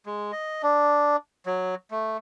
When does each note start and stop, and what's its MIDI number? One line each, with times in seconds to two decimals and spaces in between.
0.06 0.32 56
0.32 0.62 75
0.63 1.16 62
1.46 1.75 54
1.91 2.17 57